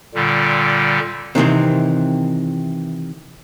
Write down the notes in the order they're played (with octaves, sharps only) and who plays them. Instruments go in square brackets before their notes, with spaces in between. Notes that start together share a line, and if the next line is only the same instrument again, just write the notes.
[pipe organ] A#2 D3 G3
[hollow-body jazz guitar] C3 D#3 E3 C4